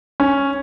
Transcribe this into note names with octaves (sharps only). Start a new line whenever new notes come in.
C#4